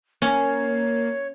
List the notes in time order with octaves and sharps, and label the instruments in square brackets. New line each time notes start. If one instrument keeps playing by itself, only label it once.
[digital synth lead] A#3 [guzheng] C#4 [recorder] C#5